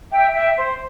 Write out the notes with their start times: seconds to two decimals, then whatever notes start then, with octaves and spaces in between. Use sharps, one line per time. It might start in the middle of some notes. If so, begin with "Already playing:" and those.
0.12 E5 G5
0.34 E5 G5
0.56 C5